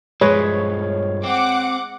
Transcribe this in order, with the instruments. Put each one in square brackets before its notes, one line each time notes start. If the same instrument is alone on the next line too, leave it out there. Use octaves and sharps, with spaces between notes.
[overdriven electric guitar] G2 F3 [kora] G#3 B4 E5 [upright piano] C#5
[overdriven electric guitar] C4 [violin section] F#5 D6